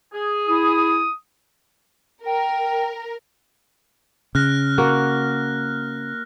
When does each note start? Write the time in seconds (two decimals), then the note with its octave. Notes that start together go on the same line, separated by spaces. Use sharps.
0.14 G#4
0.47 E4 D#6
2.26 A#4 G5
4.35 C#3 F6 F#6 A#6
4.78 A#3 F#4 A#4